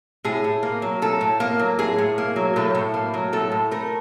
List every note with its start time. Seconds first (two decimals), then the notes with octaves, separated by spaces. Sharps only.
0.24 A2 G#4
0.44 A2
0.63 A#3
0.82 F#3
1.02 A2 A4
1.21 A2
1.40 A#3
1.59 F#3
1.79 A2 G#4
1.98 A2
2.18 A#3
2.36 F#3
2.56 A2 A4
2.75 A2
2.94 A#3
3.14 F#3
3.33 A2 A4
3.52 A2
3.71 A3 A#4